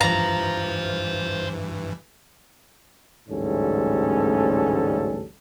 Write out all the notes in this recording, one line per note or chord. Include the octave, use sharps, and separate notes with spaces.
G2 E3 C5 F5 A#5
A1 D2 G#2 G3 C#4 A4